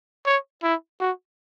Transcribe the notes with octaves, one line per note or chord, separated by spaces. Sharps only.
C#5
E4
F#4